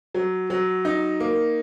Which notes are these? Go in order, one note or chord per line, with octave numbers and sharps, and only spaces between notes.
F#3
F#3
D#4
A#3